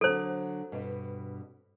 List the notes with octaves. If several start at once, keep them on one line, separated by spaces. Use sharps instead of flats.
D3 F#3 A4 C5
G2 B2